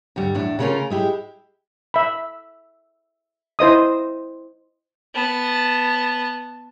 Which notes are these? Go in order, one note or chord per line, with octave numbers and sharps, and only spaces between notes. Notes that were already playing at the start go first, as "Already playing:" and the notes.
D2 G2 G3
E2 A2 D4
C#3 A3 B3 C#4 F4 A#4
G#3 E4 G4
E5 B5
E4 C5 D#5 D#6
B3 A5